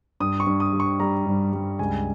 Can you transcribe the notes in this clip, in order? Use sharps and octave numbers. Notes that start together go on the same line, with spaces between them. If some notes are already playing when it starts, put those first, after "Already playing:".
G2 D#6
C#6
G2
D#6
G3
C#6
G3 A#5
G2
G3
C#2 G#5